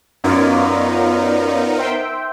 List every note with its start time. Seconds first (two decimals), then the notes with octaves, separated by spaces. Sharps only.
0.24 F#2 B3 D#4 F4 A#4 C#5 D5
1.77 C5 E5 G5